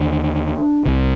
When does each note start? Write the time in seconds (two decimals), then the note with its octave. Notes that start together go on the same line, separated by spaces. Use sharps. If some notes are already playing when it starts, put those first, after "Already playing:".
Already playing: D#2 D3 D4
0.85 C2 C3